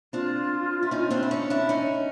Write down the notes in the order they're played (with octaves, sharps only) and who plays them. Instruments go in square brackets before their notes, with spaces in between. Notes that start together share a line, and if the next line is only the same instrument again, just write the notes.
[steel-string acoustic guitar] C4 D4 [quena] F4
[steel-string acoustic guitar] E4
C#4 D#4
C4 D4
E4
C#4 D#4
D4 E4
C#4 D#4